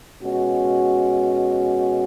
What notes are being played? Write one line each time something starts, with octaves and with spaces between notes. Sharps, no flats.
B2 G#3 C#4 F#4